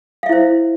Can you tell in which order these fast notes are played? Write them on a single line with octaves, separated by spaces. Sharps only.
F5 E5 E4 C5